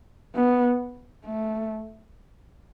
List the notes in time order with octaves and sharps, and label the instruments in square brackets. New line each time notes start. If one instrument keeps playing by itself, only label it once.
[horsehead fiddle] B3
A3